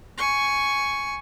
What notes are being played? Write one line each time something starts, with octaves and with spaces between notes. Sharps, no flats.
G#5 C#6